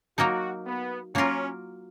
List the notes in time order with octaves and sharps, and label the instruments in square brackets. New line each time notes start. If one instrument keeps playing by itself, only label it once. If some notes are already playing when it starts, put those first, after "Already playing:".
[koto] F#3 A#3 D#4 A#4 [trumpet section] F#4
[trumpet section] B3
[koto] F#3 A#3 F4 A#4 [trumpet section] C#4